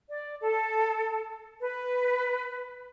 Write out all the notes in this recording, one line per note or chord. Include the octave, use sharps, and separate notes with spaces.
D5
A4
B4